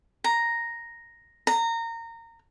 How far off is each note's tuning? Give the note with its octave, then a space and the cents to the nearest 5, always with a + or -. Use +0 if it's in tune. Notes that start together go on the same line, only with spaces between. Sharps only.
A#5 +0
A#5 -20